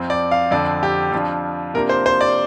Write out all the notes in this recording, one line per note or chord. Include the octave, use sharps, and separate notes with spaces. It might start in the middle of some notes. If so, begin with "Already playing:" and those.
Already playing: F2 F3 C4
D5
F5
F2 D3 F3 D4 D5
G4
F2 F3 D4 F4
C3 A#3 D4 F4 A#4
C5
C5
D5